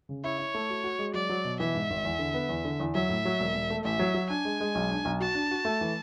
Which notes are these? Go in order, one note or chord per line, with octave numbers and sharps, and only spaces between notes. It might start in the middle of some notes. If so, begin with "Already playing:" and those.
C#3
E4 C#5
E4
A3
F#4
F#4
G#3
F#3 D5
F#3
B2
E3 E5
G#2
G#1
E2
D3
B3
E2
D3
E2
F#3 E5
A2
F#3
E1
E1
A3
A1 E5
F#3
F#3
D4 G#5
G#3
G#3
B1
D4
B1
F#4 A5
D4
F#4
A3
E3